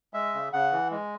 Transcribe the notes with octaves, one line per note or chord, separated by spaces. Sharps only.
G#3 E5
C#3
C#3 F#5
E3
G#3